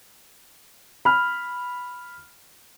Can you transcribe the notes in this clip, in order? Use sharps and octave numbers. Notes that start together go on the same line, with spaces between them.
B5 F6